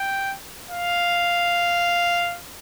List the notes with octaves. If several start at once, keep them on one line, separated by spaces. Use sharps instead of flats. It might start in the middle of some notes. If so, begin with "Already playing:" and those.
Already playing: G5
F5